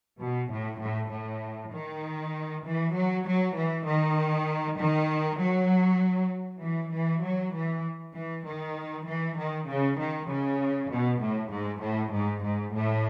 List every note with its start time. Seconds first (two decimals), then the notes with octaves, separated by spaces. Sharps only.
0.20 B2
0.50 A2
0.81 A2
1.11 A2
1.73 D#3
2.65 E3
2.94 F#3
3.26 F#3
3.56 E3
3.86 D#3
4.79 D#3
5.40 F#3
6.61 E3
6.92 E3
7.23 F#3
7.54 E3
8.15 E3
8.46 D#3
9.07 E3
9.37 D#3
9.68 C#3
9.99 D#3
10.29 C#3
10.91 B2
11.21 A2
11.51 G#2
11.81 A2
12.13 G#2
12.43 G#2
12.74 A2